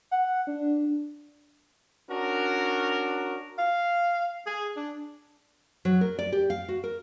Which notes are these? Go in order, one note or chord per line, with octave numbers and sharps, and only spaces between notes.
F#5
D4
C#4 D4 F#4 A#4
F5
G#4
D4
F#3
A#4
D5
G4
F5
F#4
A#4